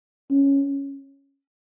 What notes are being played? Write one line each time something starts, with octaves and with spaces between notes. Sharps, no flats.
C#4